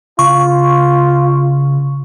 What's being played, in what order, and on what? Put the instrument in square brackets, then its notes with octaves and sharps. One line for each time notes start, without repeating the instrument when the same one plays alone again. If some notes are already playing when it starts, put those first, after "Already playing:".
[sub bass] C#3 [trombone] F4 [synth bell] C#6